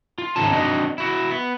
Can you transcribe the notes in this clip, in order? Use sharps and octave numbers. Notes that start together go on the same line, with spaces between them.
F4
C#2 G#2 D#3 C#4 A5
C4 D4 D#4 F#4 D#5
E4 F#4
B3